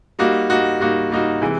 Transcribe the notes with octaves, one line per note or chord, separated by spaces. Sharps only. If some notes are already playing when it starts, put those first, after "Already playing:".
G3 A#3 D#4 F#4
G3 A#3 D#4 F#4
G3 A#3 D#4 F#4
G3 A#3 D#4 F#4
C3 E3 G#3